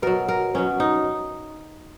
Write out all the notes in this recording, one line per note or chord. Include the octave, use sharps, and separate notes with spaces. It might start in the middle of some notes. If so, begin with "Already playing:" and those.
B2 F#3 A#4
A#4
B2 F#3 C#4
D#4